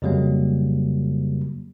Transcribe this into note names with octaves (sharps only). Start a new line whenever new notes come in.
F2 C#3 F#3 G3 A#3